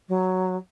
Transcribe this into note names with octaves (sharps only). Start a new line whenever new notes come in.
F#3